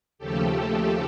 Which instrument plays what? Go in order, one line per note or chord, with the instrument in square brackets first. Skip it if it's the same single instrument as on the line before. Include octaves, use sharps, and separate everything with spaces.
[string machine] D#2 C#3 F3 A3 G4 A4